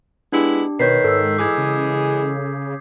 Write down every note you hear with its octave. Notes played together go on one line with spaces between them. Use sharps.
G#3 B3 D4 E4 G4
B2 D#3 B4 C#5 G6 B6 C7
G#2 A4 E6
E3 G#3 G#4 D6 D#6 G#6
C#3